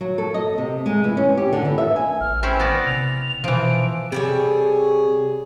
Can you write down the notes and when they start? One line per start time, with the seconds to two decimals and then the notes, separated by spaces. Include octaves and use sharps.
0.01 F#3
0.18 A4
0.34 D#5
0.58 C3
0.86 G#3
1.04 E3
1.17 C#4
1.37 G4
1.53 D3
1.65 E3
1.78 E5
1.96 G#5
2.21 A1 F6
2.43 C4 C#4 E4 G#5
2.60 B3 D5 A#6
2.86 C3 F7
3.44 B2 E3 F3 D7
4.12 C3 G3 G#4 A4 C#5